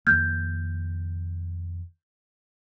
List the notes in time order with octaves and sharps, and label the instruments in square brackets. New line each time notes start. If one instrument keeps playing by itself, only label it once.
[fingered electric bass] F2 D#3 A#3 [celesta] F6 G6 G#6